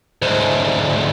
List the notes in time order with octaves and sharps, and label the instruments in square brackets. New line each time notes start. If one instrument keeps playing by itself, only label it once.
[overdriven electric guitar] D2 G#2